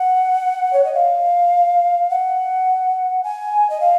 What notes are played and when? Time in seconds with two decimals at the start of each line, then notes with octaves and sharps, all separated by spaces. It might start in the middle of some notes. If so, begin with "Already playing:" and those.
Already playing: F#5
0.73 C#5
0.85 D#5
0.94 F5
2.10 F#5
3.24 G#5
3.70 D#5
3.80 F5